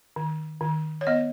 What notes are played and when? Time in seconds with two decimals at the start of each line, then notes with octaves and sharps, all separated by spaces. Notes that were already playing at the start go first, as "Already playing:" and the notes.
0.16 D#3
0.61 D#3
1.01 C#5
1.07 B3 D#5